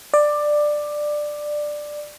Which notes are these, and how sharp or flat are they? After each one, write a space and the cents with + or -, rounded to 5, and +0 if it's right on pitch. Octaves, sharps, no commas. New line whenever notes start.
D5 +15